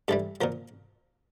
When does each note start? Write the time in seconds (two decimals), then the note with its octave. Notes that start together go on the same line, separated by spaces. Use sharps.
0.08 G2 E3 G3 A4
0.41 A#2 F3 A#4